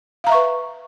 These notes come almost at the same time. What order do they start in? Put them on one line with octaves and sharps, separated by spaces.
F5 A#5 E5 C#6 B4